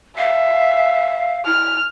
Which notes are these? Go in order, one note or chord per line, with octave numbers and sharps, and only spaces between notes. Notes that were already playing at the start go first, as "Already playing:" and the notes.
E5 F5
E4 F6